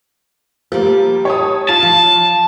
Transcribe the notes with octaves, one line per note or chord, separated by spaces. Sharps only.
F3 G3 A#3 G4
C#5 A5 D#6
F4 A5
F3